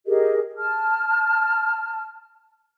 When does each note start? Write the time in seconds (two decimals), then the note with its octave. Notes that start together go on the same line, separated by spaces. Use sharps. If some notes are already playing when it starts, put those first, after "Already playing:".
0.06 G4 G#4 A#4 D#5
0.58 A5 F6